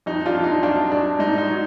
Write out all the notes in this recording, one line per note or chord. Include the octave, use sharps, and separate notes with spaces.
F2 D#4
D4 F4
F2
D#4
F#3 D4 F4
F#3 D4
G#2 D#4
D#4
F#3